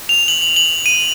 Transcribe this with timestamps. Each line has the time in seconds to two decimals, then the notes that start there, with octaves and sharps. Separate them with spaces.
0.09 F7
0.28 F#7
0.42 F#7
0.56 F#7
0.86 D#7